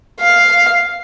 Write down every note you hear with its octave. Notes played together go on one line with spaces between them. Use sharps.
F5